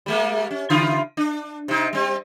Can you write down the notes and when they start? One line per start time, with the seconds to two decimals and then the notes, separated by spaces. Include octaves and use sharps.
0.06 G3 G#3 A#3
0.51 C#4
0.70 C#3 E4 F4
1.17 D4
1.68 C3 D#4
1.93 G3 C4